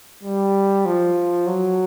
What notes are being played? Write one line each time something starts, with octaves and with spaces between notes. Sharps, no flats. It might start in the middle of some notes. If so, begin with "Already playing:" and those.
G3
F3
F#3